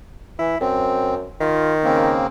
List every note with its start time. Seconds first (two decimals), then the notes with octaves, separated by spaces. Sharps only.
0.39 E3 E4
0.61 F#2 C4
1.40 D#3 F4
1.84 C#3 A#3 C4